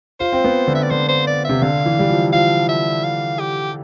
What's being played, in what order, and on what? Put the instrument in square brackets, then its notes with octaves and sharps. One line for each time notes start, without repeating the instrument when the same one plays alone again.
[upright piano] F4 [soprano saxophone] C5
[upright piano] C4
B3
D3
[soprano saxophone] E5
D5
[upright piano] D3 [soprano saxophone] C5
[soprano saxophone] C5
D5
[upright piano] C3 [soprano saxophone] E5
[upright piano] D3 [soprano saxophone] F5
[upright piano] E3
G3
F3
[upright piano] F3 [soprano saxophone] F5
[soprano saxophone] E5
F5
G4